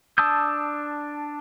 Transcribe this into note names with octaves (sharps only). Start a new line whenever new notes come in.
D4 A5 D#6 E6 G6